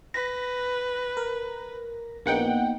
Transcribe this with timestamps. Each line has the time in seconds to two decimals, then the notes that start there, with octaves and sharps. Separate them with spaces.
0.14 B4 A#6 B6
1.17 A#4
2.26 A#1 A#3 B3 D#4 F#5 G5